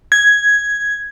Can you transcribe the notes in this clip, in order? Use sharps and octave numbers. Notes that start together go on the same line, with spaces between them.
G#6